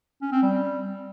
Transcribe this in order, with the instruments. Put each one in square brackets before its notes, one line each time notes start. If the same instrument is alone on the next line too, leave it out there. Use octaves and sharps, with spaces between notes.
[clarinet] C#4
C4
G3